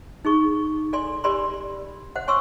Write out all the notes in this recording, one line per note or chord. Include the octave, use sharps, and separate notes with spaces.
D#4 G#4 C#6
A4 D5 G#5 C6
G4 A#4 D5 G#5 B5 C6
C5 F#5
C#5 G#5 C6 C#6 E6